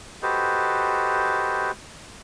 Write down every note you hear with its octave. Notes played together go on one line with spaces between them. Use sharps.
F#4 G4 A4 B4 C5 D#5